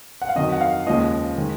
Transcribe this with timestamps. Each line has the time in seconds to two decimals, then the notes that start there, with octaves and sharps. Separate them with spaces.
0.22 F#5
0.29 F5
0.35 F2 D#3 F#3 D#5
0.52 F#5
0.61 F5
0.86 D#2 C#3 F3 G#3 D#5
1.38 D#3 G#3